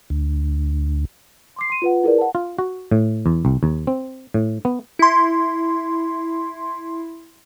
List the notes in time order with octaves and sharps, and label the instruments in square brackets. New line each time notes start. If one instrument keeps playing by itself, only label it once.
[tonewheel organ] D2
[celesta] C6 D6 C7
C6 D#7
F4 B4 F#5
E4 G#4 A#4 B4 D5
F#5 A5
[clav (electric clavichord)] F4
F#4
A2
E2
C2
D#2
C4
A2
B3
[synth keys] E4 C6